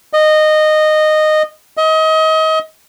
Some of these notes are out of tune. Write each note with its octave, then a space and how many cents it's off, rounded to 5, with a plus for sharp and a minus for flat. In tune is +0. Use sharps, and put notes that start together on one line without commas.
D#5 -15
D#5 +30